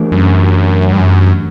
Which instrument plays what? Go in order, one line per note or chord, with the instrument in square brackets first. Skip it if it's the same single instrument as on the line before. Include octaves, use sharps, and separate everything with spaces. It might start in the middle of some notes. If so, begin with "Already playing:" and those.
Already playing: [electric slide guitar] E3 A3 D4 G4 A#4
[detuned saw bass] F#2
G2
F#2